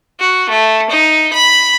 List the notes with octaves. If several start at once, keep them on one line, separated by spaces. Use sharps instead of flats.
F#4
A3
D#4
B5